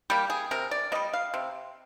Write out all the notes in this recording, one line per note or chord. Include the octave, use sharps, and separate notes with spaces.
G3 A#3 G4
G#4
C3 A#4
D5
G3 A#3 D#5
F5
C3